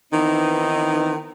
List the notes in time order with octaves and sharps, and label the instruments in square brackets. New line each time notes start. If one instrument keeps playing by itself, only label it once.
[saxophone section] D#3 E3 B3 C4 D#4